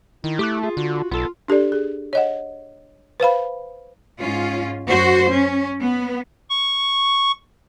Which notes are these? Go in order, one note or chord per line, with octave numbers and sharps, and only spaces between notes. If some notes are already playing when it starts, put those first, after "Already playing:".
D#3 E4
A3 G4 D6 F#6
F4 G#4
D3 F#4
B1 B3 F4 A4
D4 G4 A4 D5
G#4
C#5 D#5 F#5
B4 C5 F5 B5
G#2 C#4 F4
F#2 F#4 C5
C#4
B3
C#6